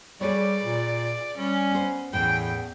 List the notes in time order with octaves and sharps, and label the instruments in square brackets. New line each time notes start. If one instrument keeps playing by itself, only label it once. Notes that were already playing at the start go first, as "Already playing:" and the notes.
[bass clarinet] G3 [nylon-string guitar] G#4 B4 C#5 [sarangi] D5
[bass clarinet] A#2
[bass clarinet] G3 [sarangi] C#4
[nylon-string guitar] B3 C5
[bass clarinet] E2 [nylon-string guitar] A2 E3 [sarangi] G5